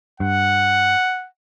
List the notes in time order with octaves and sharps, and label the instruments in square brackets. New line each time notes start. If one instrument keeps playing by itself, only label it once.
[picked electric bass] G2 [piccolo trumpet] F#5